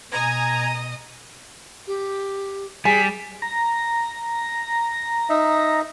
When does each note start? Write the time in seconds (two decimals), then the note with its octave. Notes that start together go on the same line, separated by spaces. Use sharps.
0.12 B2 D#5 G#5 A#5 D#6 G#6
1.87 G4
2.85 G3 G#4 G#5 B6
3.42 A#5
5.30 D#4 E5